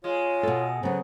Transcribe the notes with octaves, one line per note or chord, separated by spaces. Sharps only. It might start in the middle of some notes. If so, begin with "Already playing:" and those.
G#3 F4 C#5
B2 A4
C#3 F#3 B3 C5